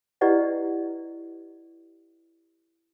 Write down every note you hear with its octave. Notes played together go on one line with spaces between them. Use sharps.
E4 G4 B4 D5 D#5 F#5